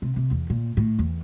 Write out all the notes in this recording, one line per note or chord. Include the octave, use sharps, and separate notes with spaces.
C3
C3
E2
A#2
A2
E2